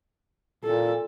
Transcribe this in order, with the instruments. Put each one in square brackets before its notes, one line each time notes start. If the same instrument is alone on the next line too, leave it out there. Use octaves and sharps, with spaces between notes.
[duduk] A#2 [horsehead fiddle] A4